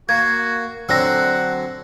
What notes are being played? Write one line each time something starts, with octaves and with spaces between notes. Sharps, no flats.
A#3 F#4 G#6
D3 F#3 C4 F#5 E6 A#6